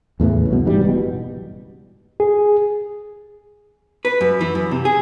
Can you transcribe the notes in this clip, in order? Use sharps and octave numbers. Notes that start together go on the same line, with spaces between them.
E2 A2 C#3 E3
C2 F#2 B2
G#2 E3 G3
F#1 B2
G#4
B4
F#2
E3
F#2
C3
G#4